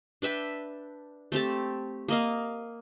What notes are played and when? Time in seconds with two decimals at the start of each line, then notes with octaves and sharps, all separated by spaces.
0.22 D4 B4 E5 G5
1.32 A3 C4 G4 A5
2.08 A#3 D#5 F5